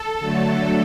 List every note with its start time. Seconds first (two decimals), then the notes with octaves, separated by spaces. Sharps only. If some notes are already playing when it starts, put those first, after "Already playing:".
Already playing: A4
0.19 D3 F#3 A3